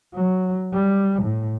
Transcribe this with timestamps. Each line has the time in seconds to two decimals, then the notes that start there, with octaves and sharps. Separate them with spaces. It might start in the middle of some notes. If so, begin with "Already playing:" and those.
0.14 F#3
0.74 G3
1.23 A2